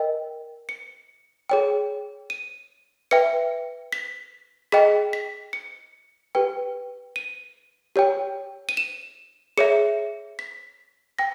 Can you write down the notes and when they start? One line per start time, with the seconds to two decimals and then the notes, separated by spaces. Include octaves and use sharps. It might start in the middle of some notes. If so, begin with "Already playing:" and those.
Already playing: A#4 D#5 G5
0.69 C#7
1.50 G#4 C#5 G5
2.30 D#7
3.11 B4 E5 G5 C#7
3.93 B6
4.72 G#4 D#5 G5 B6
5.13 B6
5.53 C#7
6.35 G4 B4 G5
7.16 D#7
7.96 G4 C#5 G5
8.69 D#7
8.77 E7
9.57 G#4 C#5 E5 C#7
10.39 B6
11.19 G5 A#6